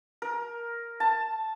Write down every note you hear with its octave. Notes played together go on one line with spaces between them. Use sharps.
A#4
A5